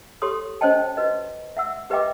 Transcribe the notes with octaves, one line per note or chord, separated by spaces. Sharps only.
G4 A4 C#5 C6 D#6
C#4 C5 C#5 D#5 G5 A5
F#4 B4 D#5
E5 F#5 E6
G4 B4 D#5 E5 G5 D6